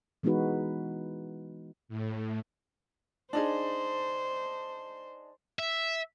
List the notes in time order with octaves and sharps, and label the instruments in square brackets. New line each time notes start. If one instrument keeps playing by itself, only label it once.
[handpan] E3 G#3 B3 D#4 F#4 B4
[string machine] A2
[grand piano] D4 D#4 G#4 [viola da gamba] C5
[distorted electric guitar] E5